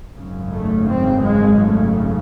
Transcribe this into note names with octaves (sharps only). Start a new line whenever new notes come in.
G#1 F#2 C#3
A3
C4
G#3
A3